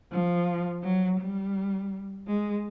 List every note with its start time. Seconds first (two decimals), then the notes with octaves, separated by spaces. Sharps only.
0.12 F3
0.83 F#3
1.20 G3
2.27 G#3